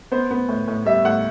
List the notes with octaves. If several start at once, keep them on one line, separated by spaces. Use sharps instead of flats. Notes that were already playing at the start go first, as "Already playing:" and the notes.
B3 C5
B3
A2
A2
G3 E5
A2 F#5